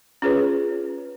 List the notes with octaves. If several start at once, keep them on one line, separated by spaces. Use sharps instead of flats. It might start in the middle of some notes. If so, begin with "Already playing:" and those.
C#4 F4 G#4 B4 C#5